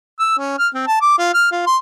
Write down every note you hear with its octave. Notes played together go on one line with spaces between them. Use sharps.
E6
C#4
F6
C4
A5
D6
F4
F6
F4
C6